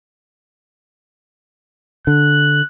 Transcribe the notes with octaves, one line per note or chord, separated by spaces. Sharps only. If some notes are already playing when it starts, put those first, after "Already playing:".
D3 F#6